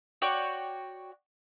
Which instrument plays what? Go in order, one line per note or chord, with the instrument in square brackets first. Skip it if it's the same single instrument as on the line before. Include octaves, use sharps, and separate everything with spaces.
[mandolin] F#4 C#5 D5 G5